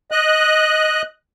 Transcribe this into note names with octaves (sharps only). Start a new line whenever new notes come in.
D#5 F#6